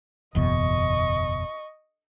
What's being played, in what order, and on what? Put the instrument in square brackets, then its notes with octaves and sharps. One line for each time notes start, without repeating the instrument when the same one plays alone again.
[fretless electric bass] F#1 E2 B2 [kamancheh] D#5 C#6